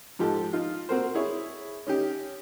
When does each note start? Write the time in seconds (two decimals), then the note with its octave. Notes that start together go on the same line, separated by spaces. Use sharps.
0.19 G#2 F3 G4 A4
0.53 D#4 F4
0.89 A#3 C4 F#4 A#4 C5
1.15 E4 G#4 C#5
1.87 C#4 D#4 G4